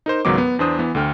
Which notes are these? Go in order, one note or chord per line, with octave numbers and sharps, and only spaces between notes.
D#4 A#4 C5
C#2 G#2 D#3 F#3 B3 D6
B3
E2 D4 C5 D#6
E3 B3
D2 D3 G5 F6